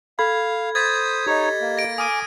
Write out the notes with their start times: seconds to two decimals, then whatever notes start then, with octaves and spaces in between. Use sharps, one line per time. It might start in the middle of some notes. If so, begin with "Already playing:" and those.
0.19 A4 F5 B5 G#6
0.75 C5 D#6 G#6 A6 B6
1.27 D#4 G4 C#5 D#5
1.61 A#3
1.78 A#6 D7
1.98 G#5 D6 D#6 F6 D#7